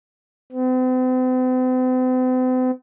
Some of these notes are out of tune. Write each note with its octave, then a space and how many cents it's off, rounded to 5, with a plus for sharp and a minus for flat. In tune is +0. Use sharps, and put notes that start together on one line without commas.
C4 -45